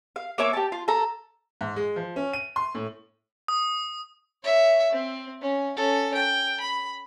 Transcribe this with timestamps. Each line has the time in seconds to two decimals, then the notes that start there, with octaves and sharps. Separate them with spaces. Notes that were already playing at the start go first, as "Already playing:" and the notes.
0.16 F5
0.38 A#3 C#5 E5 D6
0.53 G4 A5
0.72 F4
0.88 A4 A#5
1.61 G#2
1.76 G#3
1.96 F3
2.16 C#4
2.33 D#7
2.56 C6
2.75 A2
3.48 D#6
4.43 C#5 E5
4.92 C4
5.41 C#4
5.77 C#4 A4
6.14 G5
6.60 B5